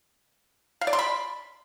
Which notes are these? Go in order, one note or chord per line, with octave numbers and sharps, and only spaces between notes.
F5
D5
C6
B5